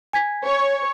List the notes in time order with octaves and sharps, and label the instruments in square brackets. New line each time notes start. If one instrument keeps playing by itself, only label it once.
[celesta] G#5 G#6 B6
[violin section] C#5